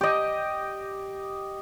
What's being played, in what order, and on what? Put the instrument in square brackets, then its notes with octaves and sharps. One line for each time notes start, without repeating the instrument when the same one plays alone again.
[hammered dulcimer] G4 D#5